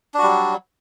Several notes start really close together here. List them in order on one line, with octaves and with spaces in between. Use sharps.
D4 F#4 G3 F#3